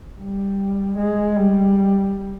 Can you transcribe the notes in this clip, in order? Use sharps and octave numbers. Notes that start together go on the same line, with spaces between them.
G3
G#3
G3